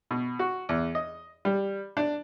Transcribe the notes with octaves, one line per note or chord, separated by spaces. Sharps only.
B2
F#4
E2
D#5
G3
D4